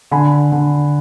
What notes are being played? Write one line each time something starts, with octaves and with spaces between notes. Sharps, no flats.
D3 G#5 B5
D3